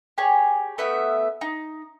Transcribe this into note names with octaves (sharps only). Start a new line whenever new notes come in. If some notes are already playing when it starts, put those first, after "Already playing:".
G4 G#4 C#5
A3 B3 E5 G6
D#4